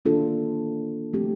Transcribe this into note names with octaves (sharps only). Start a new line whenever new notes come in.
D#3 A#3 D4 F4 A4
F3 A3 C4 G4